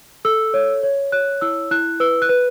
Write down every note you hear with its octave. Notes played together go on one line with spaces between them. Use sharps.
A4 E6
C#5
C#5
C#5 F#6
E4 E6
E4 F#6
B4 E6
F#6
B4